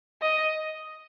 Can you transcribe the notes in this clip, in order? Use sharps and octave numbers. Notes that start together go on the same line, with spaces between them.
D#5